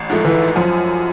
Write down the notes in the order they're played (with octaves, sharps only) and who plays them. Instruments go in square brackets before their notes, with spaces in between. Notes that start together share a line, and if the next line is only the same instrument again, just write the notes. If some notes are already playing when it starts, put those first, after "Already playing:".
Already playing: [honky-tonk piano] A1
G#2 F3 A3
[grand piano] E3
[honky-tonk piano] F#2 [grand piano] F3